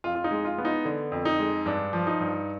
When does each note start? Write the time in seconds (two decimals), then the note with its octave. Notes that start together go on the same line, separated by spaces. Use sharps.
0.04 F2 F4
0.15 F4
0.24 D#4
0.31 G#3
0.45 F4
0.58 B3
0.65 D#4
0.85 D3
1.12 F2
1.25 D#4
1.39 G#3
1.66 G2 D4
1.93 F3
2.07 D#4
2.20 G2